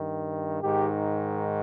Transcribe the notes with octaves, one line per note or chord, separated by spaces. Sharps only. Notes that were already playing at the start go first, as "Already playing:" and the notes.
Already playing: G2 D#3
G#2 D#3 G4